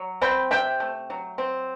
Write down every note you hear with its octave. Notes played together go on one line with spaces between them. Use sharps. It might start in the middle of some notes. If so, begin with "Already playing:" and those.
Already playing: F#3
C4 G5 B5
C3 E5 G5
A3
F#3
C4